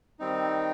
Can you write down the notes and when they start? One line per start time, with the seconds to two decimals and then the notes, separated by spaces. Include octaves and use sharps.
0.19 D#3 G3 C4 D#4